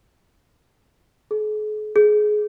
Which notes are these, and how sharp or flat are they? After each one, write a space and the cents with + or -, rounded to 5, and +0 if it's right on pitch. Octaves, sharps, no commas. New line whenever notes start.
G#4 +45
G#4 +20